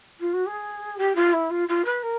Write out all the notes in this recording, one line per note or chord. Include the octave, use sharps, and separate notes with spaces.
F4
F#4
G#4
G4
F4
E4
F4
F4
B4
A#4